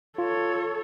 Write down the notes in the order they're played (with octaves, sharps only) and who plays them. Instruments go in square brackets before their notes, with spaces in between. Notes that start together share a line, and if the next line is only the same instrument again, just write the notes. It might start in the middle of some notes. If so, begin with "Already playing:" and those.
[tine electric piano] F4 [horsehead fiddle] A4 C#5